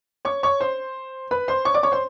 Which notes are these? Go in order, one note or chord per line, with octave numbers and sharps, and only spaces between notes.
C#5 C#6
C#5 C#6
C5 C6
B4 B5
C5 C6
C#5 C#6
D5 D6
C#5 C#6
C5 C6